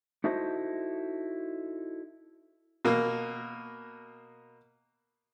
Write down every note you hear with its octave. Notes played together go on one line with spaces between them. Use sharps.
D#4 E4 F#4 A4 C5 D#5
B2 A#3